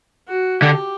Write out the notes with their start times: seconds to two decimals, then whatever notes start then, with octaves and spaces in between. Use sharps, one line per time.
0.28 F#4
0.62 D3 G4